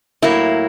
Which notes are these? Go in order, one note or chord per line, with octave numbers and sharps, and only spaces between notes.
A2 F#3 A#3 E4